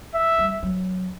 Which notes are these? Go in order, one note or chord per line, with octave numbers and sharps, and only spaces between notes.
E5
G3
F#3